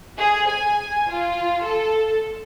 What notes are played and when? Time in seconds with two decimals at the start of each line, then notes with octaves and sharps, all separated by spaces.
0.16 G#4
0.47 G#5
1.10 F4
1.63 A4